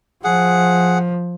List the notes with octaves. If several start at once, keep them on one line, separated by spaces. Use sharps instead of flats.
F3 G#4 F#5